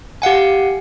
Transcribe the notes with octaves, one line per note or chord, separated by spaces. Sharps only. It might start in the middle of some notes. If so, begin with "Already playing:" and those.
G4 F5 F#5 G#5